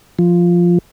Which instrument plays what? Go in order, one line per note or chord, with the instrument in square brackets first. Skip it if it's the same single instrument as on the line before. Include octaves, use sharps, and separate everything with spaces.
[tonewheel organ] F3